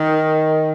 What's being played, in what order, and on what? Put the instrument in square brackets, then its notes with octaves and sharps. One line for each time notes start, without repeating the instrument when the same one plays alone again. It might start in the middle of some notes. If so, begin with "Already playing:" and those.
Already playing: [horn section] D#3